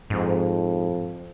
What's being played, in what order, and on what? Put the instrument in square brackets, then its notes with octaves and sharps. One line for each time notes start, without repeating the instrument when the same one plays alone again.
[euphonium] F2 [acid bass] G#2